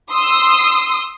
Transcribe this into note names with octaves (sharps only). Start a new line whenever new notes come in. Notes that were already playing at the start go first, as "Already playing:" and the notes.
C6 D#6 E6